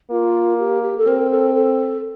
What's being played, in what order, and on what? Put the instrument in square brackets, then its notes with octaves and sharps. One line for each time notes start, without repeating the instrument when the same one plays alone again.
[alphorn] A#3 [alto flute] F4
[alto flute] G4
G4
A4
[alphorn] C4 [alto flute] A#4
[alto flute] A4
A4